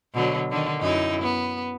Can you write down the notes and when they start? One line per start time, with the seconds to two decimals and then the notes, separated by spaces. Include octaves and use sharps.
0.14 B2 D3 F#3
0.50 D3 D#3
0.81 F#2 D#4 E4
1.22 B3